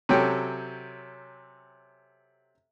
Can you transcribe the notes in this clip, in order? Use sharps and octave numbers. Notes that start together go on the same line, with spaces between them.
C3 F#3 C#4 A4 G5